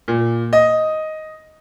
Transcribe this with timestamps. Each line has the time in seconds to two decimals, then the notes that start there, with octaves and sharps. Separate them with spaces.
0.08 A#2
0.53 D#5